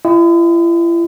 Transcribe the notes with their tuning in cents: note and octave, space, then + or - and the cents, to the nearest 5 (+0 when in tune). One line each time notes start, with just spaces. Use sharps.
E4 +45 D#5 +0 G5 +0